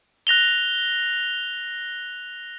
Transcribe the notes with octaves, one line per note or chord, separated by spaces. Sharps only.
F#6 A#6 F7 G7